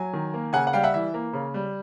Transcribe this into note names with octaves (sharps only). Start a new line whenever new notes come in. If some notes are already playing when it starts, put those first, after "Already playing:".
Already playing: F#3 G#5
D#3
A#3
C#3 F#5 G#5
F#5
G3 F5 G5
E5 F#5
E3 E5
A#3
C#3
G3